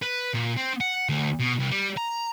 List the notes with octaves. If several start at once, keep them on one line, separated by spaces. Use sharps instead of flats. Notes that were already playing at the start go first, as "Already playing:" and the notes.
B4
A#2
C4
F#5
D2
B2
C2
G3
A#5